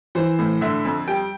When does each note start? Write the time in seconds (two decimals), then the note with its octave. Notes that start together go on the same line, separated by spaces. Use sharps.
0.15 E3 C5
0.39 A2
0.61 D3 E5
0.85 F2
1.08 G3 G5